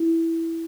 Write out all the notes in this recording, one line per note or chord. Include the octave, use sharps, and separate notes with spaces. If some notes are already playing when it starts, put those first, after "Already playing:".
Already playing: E4